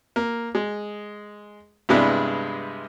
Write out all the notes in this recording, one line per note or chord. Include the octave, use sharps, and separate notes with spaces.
A#3
G#3
G2 C3 G#3 B3 D4 E4